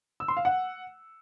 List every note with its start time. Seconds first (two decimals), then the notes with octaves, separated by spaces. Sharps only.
0.20 E6
0.28 C6
0.37 F5
0.45 F#5